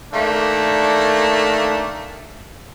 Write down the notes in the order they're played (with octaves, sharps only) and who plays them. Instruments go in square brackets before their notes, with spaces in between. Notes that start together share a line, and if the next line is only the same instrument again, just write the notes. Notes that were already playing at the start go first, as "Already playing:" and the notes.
[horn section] D#3 A3 A#3 D4